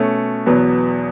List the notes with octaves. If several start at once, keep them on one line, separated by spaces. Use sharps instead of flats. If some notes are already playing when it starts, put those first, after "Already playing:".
Already playing: B2 A3 C#4
E2 B2 F#3 B3